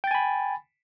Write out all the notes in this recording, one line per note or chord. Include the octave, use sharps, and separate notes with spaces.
G5 G#5 B5 A6